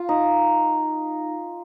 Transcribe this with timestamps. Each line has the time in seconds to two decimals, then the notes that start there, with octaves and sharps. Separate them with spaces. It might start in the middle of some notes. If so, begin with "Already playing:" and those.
Already playing: F4
0.09 D#4